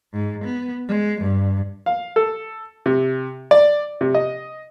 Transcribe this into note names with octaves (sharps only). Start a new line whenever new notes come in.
G#2
B3
G#3
G2
F5
A4
C3
D5
C3
D#5